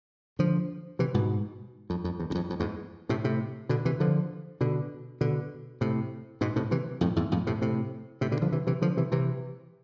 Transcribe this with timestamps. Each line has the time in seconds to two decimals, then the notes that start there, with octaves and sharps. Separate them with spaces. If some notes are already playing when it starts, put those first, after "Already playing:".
0.39 D3 F3
0.99 C3 E3
1.14 G#2 B2
1.90 F2
2.04 F2
2.19 E2
2.30 E2
2.35 F2
2.50 F2
2.60 E2 G#2
3.09 A2 C3
3.24 A2 C3
3.69 B2 D3
3.85 C3 E3
4.00 D3 F3
4.61 B2 D3
5.21 B2 D3
5.81 A2 C3
6.41 G#2 B2
6.56 A2 C3
6.71 C3 E3
7.01 F2 A2
7.16 E2 G#2
7.32 F2 A2
7.47 A2 C3
7.61 A2 C3
8.21 A2 C3
8.31 B2 D3
8.42 D3 F3
8.52 C3 E3
8.67 C3 E3
8.82 D3 F3
8.97 C3 E3
9.12 C3 E3